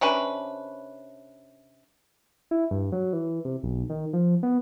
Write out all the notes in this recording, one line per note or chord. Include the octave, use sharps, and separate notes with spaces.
C3 C#4 D4 B4
E4
G2
F#3
E3
C3
B1
D#3
F3
B3